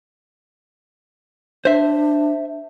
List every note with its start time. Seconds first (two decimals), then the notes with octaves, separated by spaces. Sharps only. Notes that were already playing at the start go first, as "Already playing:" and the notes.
1.65 D4 C5 E5